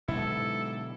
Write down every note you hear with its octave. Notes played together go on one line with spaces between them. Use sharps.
G#2 B2 D3 F#3 E4 A4